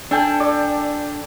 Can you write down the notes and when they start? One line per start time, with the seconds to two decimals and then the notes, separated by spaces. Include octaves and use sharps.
0.11 D4 A4 G5 G#5
0.40 D5